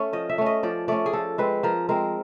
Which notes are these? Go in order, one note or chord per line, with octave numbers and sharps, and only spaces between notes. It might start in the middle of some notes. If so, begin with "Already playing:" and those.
Already playing: A3 C#4 C#5
F3 D#5
E5
A3 C#4
D#5
F3 D5
A3 C#4 D5
G#4
F3 A4
G#3 C4 B4
F3 A#4
G#3 C4 A#4